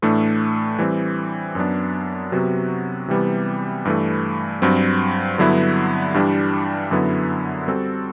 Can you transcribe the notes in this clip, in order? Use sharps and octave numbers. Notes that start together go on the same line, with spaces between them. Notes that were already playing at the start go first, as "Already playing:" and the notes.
A2 E3 A3 D4
E3 G3 C4
F#2 F#3 B3 D4
C3 F#3 B3 F#4
C3 E3 G3 B3
G2 E3 A3
G2 F#3 C4
G2 D3 F#3 B3 E4
G2 E3 G3 D4
F#2 D3 F#3 B3 E4
G3 C4 F#4 A4